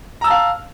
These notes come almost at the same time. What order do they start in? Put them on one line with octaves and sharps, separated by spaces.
A#5 E6 A5 F5